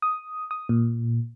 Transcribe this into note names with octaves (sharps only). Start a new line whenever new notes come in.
D#6
D#6
A#2